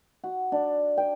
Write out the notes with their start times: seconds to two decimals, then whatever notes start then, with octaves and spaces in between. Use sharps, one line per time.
0.24 F#4
0.52 D4
0.97 G5